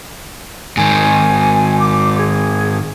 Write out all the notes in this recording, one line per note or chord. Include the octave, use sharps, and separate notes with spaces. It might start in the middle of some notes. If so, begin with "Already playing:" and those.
G#2 D#3 G#5
D6
G#4